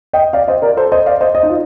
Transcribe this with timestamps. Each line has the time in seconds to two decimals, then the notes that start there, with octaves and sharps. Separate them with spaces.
0.13 D#5 G5
0.33 D5 F5
0.48 C5 D#5
0.62 A#4 D5
0.77 A4 C5
0.92 C5 D#5
1.06 D5 F5
1.21 C5 D#5
1.35 C5 D#5
1.43 D#4
1.50 F4